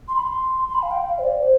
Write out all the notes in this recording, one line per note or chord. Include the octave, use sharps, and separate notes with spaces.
C6
B5
C6
C6
B5
F5
G5
F5
C5
D5
C5